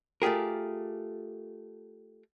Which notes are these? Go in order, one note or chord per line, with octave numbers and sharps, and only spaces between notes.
A3 F4 G4 G#4 A#4